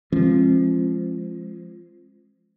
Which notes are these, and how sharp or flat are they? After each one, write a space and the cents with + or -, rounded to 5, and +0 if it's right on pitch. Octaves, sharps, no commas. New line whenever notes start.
F3 -20 G#3 +0 C4 +40